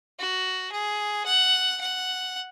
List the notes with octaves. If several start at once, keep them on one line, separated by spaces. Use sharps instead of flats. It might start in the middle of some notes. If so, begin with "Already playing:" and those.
F#4
G#4
F#5
F#5